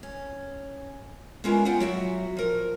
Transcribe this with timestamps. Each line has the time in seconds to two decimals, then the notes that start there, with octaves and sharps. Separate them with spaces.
0.03 C#4
1.44 G#3 B3 C#4 E4 F4 A#4
1.65 B3 D#4 F4 F#5 G5
1.80 F#3 F#4 E5
2.37 F3 A#4